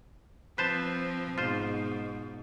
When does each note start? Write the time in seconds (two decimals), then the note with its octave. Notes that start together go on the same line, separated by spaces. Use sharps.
0.58 F3 C4 B4 C5 A5
1.38 G#2 B2 F4 C5